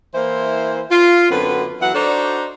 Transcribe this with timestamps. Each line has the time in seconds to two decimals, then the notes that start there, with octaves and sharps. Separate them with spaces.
0.14 E3 A#3 E4 C5
0.91 F4
1.30 F#2 D3 B3 C4 F#4 B4
1.81 E3 F#3 B3 F#5
1.94 D4 D#4 F#4 A4 C5 D5